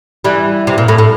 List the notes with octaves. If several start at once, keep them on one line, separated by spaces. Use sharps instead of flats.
E3 G3
C3
A#2
A2
A2